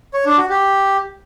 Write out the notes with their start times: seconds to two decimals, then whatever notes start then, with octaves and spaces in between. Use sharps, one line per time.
0.14 C#5
0.26 D4
0.38 F#4
0.50 G4